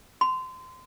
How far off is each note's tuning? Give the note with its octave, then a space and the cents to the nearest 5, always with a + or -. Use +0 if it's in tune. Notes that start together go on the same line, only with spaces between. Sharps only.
C6 -25